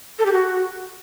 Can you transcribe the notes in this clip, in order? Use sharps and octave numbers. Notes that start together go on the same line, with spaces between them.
A4
G4
F#4